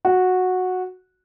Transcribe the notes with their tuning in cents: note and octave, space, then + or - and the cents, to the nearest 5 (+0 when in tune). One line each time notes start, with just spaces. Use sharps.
F#4 -10